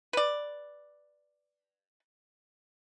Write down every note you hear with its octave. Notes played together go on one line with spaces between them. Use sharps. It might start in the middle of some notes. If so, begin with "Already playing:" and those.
B4 D5